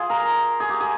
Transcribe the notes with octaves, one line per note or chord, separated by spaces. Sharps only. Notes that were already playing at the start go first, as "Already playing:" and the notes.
Already playing: F4 G#4
A#4
G#4
G4
G#4